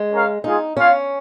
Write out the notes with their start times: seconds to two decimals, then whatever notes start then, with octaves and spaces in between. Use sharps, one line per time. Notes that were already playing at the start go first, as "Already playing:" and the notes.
Already playing: G#3
0.12 C#4 A#4 C#5 F5
0.44 G#3 D#4 F4 G#4
0.77 C#4 F4 C#5 F5